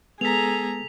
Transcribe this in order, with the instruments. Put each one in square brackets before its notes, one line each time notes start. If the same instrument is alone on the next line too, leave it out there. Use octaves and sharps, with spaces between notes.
[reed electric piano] G#3 B3 [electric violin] G#4 [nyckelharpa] A4 A#5 [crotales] B6 F7